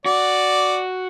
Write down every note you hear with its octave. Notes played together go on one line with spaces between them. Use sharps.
F#4 D5